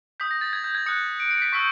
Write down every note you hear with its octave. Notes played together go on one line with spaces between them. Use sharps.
D#6 G6 B6
A#6
A6
G#6
G6
G#6
D#6 F#6 C#7
D7
C#7
B6
C#6 E6 G6 B6